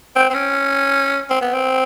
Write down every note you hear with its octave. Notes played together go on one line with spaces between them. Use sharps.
C4
C4
C#4
C4
B3
C4